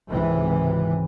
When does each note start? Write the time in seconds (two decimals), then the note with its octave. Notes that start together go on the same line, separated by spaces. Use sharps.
0.10 G#1 C#2 C3 E3